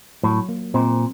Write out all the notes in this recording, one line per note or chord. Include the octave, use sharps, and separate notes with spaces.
A2 F#3
A#3
A#2 C4